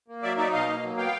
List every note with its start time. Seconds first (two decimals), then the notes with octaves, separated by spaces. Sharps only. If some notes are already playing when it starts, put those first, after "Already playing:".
0.08 A#3
0.23 F#3 D5 E5
0.37 D#4 D5 E5
0.53 B2 D#5 F5
0.68 A#3
0.83 F#3
0.97 B3 F5 G5